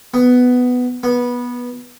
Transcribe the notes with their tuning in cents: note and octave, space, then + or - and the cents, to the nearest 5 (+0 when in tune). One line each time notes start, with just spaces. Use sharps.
B3 +10
B3 -15